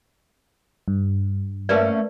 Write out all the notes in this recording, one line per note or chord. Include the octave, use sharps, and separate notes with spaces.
G2
A3 A#3 C#4 A#4 B4 D5